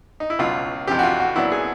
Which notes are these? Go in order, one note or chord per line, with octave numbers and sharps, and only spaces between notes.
D#4
E4
C#2 B2 F#3 F4
F2 C3 E3 G4
F#4
F4
F#4
A#2 F#3 B3 D4 E4
G#4